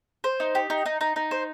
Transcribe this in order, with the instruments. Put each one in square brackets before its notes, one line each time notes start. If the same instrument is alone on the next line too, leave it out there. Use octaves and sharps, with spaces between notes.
[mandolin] C5
D#4
G4
D#4
D#4
D#4
D#4
C5